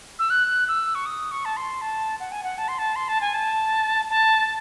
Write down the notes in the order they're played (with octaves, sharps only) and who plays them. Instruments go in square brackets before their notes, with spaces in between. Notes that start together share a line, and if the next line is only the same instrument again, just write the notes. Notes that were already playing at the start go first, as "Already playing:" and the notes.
[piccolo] E6
F#6
E6
C#6
D#6
C#6
A5
C6
A5
F#5
G#5
F#5
A5
C6
A5
C6
A5
G#5
A5
A5